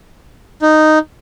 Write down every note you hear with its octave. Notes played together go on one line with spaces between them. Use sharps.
D#4